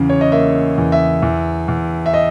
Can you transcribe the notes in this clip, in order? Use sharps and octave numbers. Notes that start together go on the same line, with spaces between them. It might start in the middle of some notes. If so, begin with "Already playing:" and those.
Already playing: E2 C#3
C#5
D#5
A#3 E5
E2
E5
E2
E2
E5
D#5